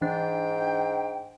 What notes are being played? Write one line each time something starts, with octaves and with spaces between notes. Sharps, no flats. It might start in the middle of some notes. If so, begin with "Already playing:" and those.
G#2 E3 D4 G5